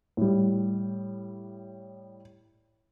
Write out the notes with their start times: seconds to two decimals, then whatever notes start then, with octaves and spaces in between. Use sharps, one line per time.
0.17 A2 G3